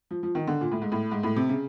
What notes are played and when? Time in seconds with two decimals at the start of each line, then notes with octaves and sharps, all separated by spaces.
0.11 F3
0.23 F3
0.35 D#3
0.47 D3
0.61 A#2
0.72 A2
0.82 G#2
0.92 A2
1.11 G#2
1.23 A2
1.36 C3
1.49 C#3